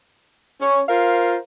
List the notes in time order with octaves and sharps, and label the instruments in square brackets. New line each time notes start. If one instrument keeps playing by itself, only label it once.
[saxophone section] C#4 C#5
F4 A#4 C5 F5